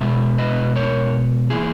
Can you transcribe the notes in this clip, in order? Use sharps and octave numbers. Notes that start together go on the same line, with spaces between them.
B2 G#3 E5
B4 D#5
A#4 C#5
E3 A#3 E4 G#4